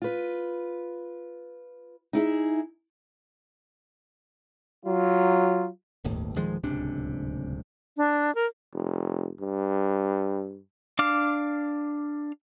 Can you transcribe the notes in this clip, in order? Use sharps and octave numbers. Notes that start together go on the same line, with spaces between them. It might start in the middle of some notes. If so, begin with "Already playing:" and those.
F4 B4
D#4 E4 G#4 E5
F#3 F4
D1 G1 D#2 A2
D1 D#3 F3 G#3
D1 C#2 C3 D4
D4
A#4
F1
G2
D4 F5 D6 F6